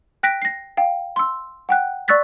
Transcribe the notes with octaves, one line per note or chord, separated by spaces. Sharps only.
G5 F#6 A#6 B6 D7
A#6 C7
F5 G5
C6 E6
F#5 G5 F#6
D5 C#6 E6 F#6 A6 B6